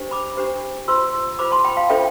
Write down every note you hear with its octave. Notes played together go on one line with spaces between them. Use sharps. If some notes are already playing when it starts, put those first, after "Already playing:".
Already playing: D4 G4 C5
B5 D6
D4 G4 C5
F4 C5 C6 E6
F4 C5 B5 D6
A5 C6
G5 B5
F5 A5
D4 F4 A4 C5 E5 G5